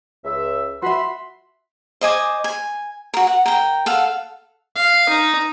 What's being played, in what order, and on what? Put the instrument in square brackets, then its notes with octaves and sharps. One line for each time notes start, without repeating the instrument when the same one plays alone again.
[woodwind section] C#2 E5
[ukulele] F#4 E5 [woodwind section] B5 [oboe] C6
[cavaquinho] C5 D#5 G#5 D6
G#5
F#4 A#4
F#5
A#4 G5
A4 F5 F#5
[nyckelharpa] F5
D#4